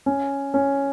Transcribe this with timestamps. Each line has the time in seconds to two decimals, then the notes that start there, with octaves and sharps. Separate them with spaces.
0.06 C#4
0.54 C#4